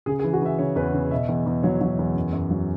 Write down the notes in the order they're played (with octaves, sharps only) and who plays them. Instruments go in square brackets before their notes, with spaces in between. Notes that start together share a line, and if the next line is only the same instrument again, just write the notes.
[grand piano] C#3 G#4
G#4
E3
F#4
E3 E5
C#3 C#5
E2 B4
C#3
B2 E5
E2
E2
F#3 C#5
F#3
E2
F#2
F#2
F#3